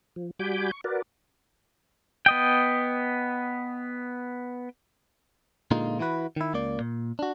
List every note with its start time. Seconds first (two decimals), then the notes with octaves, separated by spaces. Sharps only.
0.16 F3
0.39 G3 F#4 G#5 B5 D6 G6
0.72 C#6
0.84 F#4 A#4 B4 D5
2.26 B3 D#5 G5
5.71 A#2 D3 G#3 A#3 D#4 F4
5.99 E3 E4 F#4 B4
6.36 D#3 E4
6.54 C#2 A#3 D5
6.80 A#2
7.19 D4 F#4